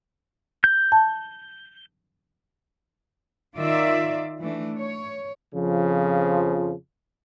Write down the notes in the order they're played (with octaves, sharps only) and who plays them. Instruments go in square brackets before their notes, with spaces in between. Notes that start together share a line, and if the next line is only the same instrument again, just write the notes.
[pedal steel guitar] G6
[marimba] A5
[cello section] D#3 F4 D5 E5
E3 A3 D4
C#5
[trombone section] F2 C#3 F3